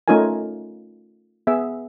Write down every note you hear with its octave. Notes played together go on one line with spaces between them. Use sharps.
A3 C#4 D#4 F4 A#4 G#5
B3 G#4 E5